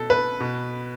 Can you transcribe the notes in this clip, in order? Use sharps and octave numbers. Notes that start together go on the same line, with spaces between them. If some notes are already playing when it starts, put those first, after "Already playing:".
Already playing: B2 A4
B4
B2